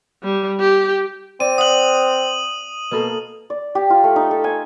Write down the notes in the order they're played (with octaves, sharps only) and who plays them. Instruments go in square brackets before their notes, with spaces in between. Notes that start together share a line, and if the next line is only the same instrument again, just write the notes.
[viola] G3
G4
[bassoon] C4 [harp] D5 [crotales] D#7
[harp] F#5 F#6 [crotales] D#6 F#7
[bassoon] B2 [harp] A#3 A4 A#4
[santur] D5
G4
F4
A3
D#4
A4
G#5